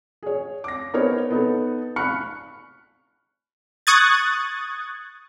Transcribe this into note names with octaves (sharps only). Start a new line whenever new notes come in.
G#4 C#5
D6 A#6
B3 D#4 A#4 C5 C#5
B3 D#4 A4
B5 C#6 F6 F#6 C#7
C#6 D#6 F#6 G#6 A6